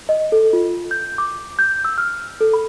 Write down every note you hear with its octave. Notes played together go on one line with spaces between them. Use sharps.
D#5
A4
F4
G6
D6
G6
E6
F6
A4
B5